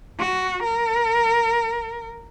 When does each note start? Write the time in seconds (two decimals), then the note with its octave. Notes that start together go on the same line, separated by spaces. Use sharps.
0.19 F#4
0.63 A#4